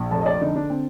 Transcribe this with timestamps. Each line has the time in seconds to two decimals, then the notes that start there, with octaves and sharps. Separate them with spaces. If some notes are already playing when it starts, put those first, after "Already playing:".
Already playing: A#1
0.11 F1 A5
0.21 D#5
0.26 D5
0.41 D3 D#4
0.56 D4
0.70 C4